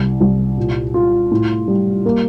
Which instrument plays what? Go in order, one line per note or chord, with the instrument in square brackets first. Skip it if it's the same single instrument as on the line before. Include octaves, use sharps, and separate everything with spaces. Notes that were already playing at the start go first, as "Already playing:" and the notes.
Already playing: [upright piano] C2
C2
A#2
F4
A2
G3
A#3